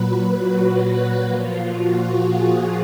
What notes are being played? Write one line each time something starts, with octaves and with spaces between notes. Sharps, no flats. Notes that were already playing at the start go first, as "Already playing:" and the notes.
Already playing: A#2 F#3 B4
F#4
F#4
A#2 F3 F4
F#4
G#4